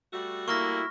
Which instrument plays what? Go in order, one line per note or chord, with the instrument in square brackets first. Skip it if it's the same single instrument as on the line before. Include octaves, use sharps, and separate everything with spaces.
[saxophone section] G3 A3 F#4
[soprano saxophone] A#3 [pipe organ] E4 [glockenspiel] C#6 F6 A#6